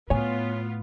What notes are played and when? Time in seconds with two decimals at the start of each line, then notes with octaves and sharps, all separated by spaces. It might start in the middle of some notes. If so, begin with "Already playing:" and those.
0.10 A2 B3 F4 C#5 G#5